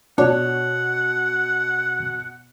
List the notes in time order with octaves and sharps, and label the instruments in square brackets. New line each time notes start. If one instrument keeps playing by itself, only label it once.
[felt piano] B2 [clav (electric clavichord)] D4 [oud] C#5 [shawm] F#5